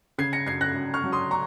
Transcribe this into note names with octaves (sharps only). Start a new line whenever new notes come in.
C#3 G#6 C7
A#6 C#7
F#2 G#6 C7
F#6 A#6
F#2
C#6 F6
F#3
C6 D#6
A#5 C#6